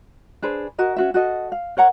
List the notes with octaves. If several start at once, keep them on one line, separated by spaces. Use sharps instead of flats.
D4 G#4 B4 C5
F#4 A#4 D#5
C#4 F#4 E5
F#4 A4 D#5
F5
A#4 C#5 F#5 A#5